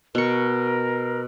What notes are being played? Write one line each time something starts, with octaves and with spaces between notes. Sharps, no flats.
B2 A#4 C#6